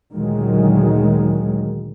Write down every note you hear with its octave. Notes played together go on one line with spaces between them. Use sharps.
D2 A#2 D#3 F#3 G#3